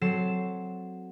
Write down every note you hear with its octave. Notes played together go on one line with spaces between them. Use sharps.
F#3 C4 A4 C7 E7